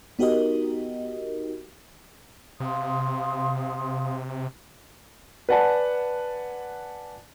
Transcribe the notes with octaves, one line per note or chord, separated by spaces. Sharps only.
B3 D#4 F#4 G4 A#4 D#5
C3 F5 C6 D#6
B4 D5 F#5 G#5 A5